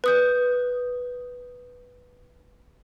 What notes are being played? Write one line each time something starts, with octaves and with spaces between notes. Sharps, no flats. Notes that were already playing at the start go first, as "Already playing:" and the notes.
B4 D#6 G6